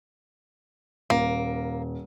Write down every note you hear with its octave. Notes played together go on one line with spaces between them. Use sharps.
D#1 A#3